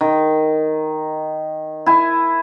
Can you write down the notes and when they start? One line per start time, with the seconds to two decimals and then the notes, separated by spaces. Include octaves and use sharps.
0.01 D#3
1.86 E4 G#5